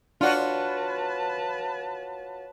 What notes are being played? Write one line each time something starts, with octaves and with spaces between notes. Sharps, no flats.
D4 F4 F#4 B4 C#5 A5